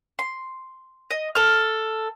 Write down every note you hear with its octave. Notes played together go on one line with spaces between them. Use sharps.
C6
D#5
A4 F6